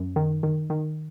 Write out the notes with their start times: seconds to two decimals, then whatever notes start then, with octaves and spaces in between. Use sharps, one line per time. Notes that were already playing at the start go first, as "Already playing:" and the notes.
Already playing: F#2
0.16 D#3
0.43 D#3
0.70 D#3